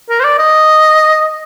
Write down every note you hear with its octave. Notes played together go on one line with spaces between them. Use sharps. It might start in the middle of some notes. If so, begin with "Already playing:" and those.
A#4
C5
D5
D#5